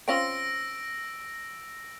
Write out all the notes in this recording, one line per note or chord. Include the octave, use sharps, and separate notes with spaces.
C4 C#4 F4 E6 A#6 D7